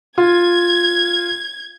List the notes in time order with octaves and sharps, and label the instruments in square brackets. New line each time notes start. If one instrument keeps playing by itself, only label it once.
[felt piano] F4 [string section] G#6